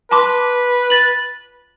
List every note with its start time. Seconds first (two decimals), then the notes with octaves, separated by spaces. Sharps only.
0.11 B4 A5 C6 D6
0.90 A6 F#7